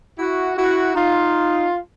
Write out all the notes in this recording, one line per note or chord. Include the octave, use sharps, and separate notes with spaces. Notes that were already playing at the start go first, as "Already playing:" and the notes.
E4 F#4
E4 F#4
D#4 F4